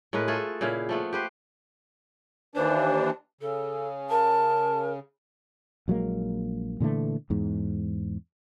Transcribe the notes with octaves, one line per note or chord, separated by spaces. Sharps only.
A2 G#3 A#4 B4
A3 F4 G#4 A4
A#2 C#3 E4 F5
F3 A3 B3
G4 B4 C5
D#2 E3 D4 C5
C#3 A4
A#4 A5
A#1 F#3 G#3 A#3
A#2 D3 E3 A3
E2 G#2